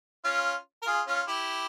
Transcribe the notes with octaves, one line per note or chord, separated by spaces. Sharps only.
C#4 F4
A#4
F4 G#4
C#4 F4
E4 G4